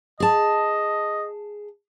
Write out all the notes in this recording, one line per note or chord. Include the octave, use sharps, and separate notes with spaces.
G#4 D#5 A5